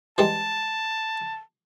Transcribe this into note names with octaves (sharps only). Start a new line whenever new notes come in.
E3 G3 G#3 A5